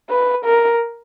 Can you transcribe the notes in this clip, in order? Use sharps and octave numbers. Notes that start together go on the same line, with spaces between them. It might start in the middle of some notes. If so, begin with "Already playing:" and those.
B4
A#4